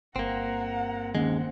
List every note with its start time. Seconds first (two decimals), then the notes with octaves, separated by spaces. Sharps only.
0.16 G1 A#3 C4 F#5 A#5
1.15 D#2 D#3 G#3 A#3 C4 C#4 F#5